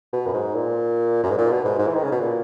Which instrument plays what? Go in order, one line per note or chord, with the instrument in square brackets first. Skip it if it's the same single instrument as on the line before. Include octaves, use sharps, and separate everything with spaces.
[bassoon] B2
F#2
G#2
A#2
F#2
G#2
A#2
B2
G#2
G#2
E3
D#3
C#3
B2
A#2